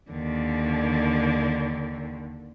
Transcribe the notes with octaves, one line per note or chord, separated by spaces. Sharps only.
D#2 D3